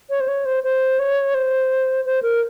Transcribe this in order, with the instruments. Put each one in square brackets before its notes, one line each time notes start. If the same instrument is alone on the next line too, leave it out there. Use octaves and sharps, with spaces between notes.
[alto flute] C#5
C5
C#5
C5
C5
C#5
C5
C5
A#4